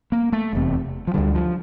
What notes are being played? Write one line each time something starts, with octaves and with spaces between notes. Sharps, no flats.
A#3
A3
F1 E2 C3
F3
D2 D3 G3
F3